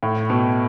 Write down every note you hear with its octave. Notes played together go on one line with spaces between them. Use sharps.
A2
B2